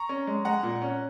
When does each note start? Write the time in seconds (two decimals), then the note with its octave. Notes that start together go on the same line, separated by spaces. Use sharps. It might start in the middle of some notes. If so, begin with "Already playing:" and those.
Already playing: A#5 C#6
0.09 C#4
0.27 G#3
0.45 G#3 F#5 A#5
0.63 A#2
0.82 C#4